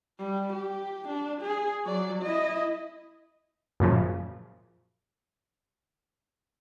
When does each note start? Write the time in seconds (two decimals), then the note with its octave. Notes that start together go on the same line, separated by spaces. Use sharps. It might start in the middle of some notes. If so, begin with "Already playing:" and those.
0.19 G3
0.53 G4
1.09 D4
1.42 G#4
1.85 F#3 D5
2.22 E4 D#5
3.80 F#2 A#2 C#3 F3